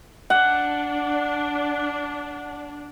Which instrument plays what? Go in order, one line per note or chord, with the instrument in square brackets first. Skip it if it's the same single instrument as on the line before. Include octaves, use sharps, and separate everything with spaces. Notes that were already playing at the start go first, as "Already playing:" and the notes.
[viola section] D4 [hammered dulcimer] F#5